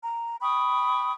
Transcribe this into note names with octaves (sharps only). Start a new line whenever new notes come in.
A#5
G5 B5 C#6 D#6